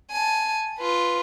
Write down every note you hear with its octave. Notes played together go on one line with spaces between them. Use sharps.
G#5 A5
F4 B4